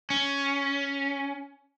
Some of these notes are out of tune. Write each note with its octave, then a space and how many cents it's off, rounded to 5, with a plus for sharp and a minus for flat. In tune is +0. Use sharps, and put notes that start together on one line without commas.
C#4 +5